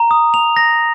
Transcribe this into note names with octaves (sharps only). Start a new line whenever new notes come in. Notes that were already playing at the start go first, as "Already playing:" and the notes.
Already playing: A#5
D#6
F7
A#6